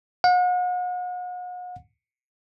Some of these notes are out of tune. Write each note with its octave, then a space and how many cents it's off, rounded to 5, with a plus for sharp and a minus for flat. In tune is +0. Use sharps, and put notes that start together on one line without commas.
F#5 -40